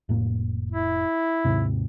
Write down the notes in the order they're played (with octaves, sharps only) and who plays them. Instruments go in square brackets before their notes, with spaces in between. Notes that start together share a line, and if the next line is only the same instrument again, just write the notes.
[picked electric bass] F1 A2 A#3
[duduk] E4
[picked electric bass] D#2 G#2 C3